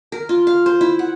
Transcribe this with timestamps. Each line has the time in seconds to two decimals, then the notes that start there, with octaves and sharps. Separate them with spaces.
0.12 A#4
0.29 F4
0.47 F5
0.66 C5
0.81 E4
0.99 F#5